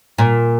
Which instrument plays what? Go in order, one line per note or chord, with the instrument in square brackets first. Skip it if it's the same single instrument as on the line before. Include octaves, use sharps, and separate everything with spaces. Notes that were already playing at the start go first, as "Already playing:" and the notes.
[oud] A#2